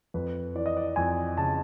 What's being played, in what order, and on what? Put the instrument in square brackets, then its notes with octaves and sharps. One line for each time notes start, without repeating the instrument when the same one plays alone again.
[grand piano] F2 B4
E3 D5
D#5
D5
F2 G#5
C#3 A5